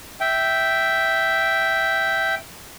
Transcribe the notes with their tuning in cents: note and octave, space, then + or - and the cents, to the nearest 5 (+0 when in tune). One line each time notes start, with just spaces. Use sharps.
E5 +0 G5 -5